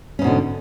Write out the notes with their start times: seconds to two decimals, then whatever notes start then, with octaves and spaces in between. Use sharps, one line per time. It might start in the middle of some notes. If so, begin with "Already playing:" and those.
0.19 C#4
0.22 G#2
0.24 B2
0.27 D3